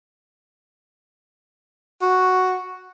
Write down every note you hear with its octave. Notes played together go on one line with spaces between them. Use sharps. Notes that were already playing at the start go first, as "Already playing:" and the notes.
F#4